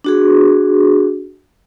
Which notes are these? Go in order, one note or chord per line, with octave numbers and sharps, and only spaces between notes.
D4 F#4 G#4